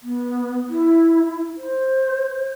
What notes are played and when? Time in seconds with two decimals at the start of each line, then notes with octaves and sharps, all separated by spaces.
0.02 B3
0.69 E4
1.57 C5